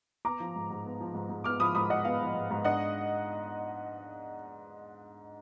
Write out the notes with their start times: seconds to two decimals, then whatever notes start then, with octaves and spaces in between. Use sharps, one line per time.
0.25 B3 A#5 D6
0.40 F3
0.56 G#2
0.70 G#2
0.85 B3
1.00 F3
1.15 G#2
1.29 G#2
1.44 B3 D6 F6
1.60 F3 B5 D#6
1.75 G#2 B5 D#6
1.90 G#2 D#5 F#5
2.05 B3 F5
2.20 F3
2.35 G#2
2.51 G#2
2.65 D4 D#5 F#5